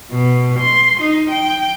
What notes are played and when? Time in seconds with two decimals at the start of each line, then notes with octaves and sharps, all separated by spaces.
0.12 B2
0.60 C6
1.00 D#4
1.30 G5